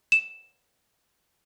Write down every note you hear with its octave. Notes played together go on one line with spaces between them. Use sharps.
E7